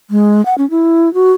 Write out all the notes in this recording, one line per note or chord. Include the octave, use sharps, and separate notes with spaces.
G#3
F#5
C#4
E4
F#4